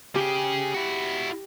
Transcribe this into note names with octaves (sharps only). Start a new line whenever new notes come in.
C#3 G4 G#4
E4 F#4